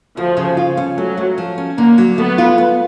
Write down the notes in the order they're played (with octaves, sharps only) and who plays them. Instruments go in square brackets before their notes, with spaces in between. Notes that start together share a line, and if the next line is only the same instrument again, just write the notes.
[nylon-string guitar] D2 [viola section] F3
[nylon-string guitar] C#3
F4
C#4
[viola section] F#3 [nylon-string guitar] A3
[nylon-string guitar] A3
F3
C#4
[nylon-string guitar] D3 [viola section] A#3
[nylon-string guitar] F#3
[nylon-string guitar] A3 [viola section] B3
[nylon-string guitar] F4
B3